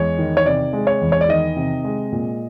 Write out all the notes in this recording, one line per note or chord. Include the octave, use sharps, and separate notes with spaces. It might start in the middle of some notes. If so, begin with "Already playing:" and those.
Already playing: E2 G#3 C#5
D#3
C#5
C3 D5
G#3
C#5
E2
C#5
D5
D#3 D#5
C3
G#3
A#2